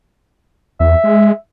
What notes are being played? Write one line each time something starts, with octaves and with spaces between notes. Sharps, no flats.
E2 E5
G#3